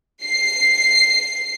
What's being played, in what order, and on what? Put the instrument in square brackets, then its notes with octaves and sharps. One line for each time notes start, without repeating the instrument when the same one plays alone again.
[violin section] C7